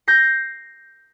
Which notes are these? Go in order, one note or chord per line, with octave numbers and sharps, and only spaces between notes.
G6 A#6 C7